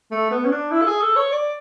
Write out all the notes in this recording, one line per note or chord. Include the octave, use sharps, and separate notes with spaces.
A3
B3
C#4
D4
E4
A4
G#4
A4
C#5
D5